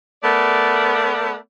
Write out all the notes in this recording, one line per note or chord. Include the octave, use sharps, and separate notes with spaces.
A3 B3 A#4 D5